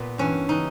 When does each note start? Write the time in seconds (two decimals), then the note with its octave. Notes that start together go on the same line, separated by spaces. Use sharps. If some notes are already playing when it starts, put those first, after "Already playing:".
Already playing: A#2 B3
0.18 G2 E3 C#4
0.49 C#3 E3 D#4